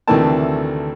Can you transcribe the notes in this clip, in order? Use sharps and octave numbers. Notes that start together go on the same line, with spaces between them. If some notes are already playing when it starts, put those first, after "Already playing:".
D2 C3 D#3 E3 A3 A5